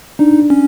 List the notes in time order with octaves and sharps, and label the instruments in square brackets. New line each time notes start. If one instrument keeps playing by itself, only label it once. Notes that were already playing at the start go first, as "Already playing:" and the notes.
[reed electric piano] D4 [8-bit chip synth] D#4
[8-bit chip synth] C#4